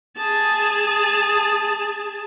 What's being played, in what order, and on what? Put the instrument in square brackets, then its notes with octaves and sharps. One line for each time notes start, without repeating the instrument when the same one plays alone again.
[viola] G#4 A5